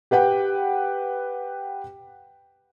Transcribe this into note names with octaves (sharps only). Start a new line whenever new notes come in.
G4 B4 F#5 G5